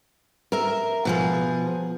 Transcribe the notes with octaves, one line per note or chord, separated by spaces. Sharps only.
A#4 E5
B2 F3 G#4